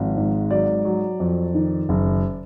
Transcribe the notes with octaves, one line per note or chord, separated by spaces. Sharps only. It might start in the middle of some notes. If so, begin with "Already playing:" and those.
Already playing: G#1 F3
G#2
F#3 D5
F#3
F2
D#3
F#1